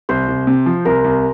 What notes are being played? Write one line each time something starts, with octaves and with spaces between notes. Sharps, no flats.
C2 C5
C2
C3
F3
C2 A#4
C2